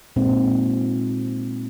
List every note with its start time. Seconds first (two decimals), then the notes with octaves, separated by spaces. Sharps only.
0.16 A#2 G#3 C4 D#4